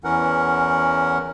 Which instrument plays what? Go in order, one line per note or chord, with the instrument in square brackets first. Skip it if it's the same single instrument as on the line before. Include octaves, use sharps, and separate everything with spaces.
[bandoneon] E2 E3 C#4 A#4 F#5